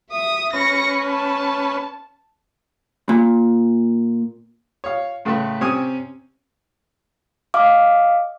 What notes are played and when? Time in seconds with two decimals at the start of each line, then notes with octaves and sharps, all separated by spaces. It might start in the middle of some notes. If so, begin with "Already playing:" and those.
0.11 E5 D#6
0.53 C#4 B4 A#6 C#7
1.07 A5
3.09 A#2
4.84 C#5 F5
5.25 A2 C#3 A3 A4 B4 C6
5.61 C3 C4 C#4 C#5 G#5 D#6
7.54 D#5 F5 D6